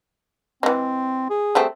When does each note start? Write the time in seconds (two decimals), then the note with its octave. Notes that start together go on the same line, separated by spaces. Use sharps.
0.63 E3 G#3 C4
1.30 G#4
1.55 G3 A3 C4